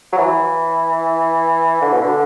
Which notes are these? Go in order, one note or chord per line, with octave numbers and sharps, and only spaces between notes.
F#3
E3
D3
B2
D3